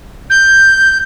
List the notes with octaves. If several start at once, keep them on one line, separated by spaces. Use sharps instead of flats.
G6